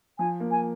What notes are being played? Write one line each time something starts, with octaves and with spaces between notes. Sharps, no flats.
F3 G#5
A#3
G#5